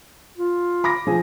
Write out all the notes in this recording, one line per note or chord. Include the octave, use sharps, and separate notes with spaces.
F4
B5 D6 A#6
F3 G#4